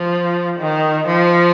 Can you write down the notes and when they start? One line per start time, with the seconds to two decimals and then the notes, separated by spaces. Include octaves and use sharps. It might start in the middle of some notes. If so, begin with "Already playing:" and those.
Already playing: F3
0.59 D#3
1.08 F3